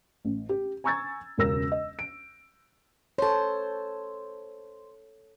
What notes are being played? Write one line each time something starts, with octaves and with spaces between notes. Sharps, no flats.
A1
G4
G#5 A#5 C#6 E6 G#6 A6
E1 C#2 C#3 A#4 E6 A#6
D#5
D7
A4 C5 C#5 A5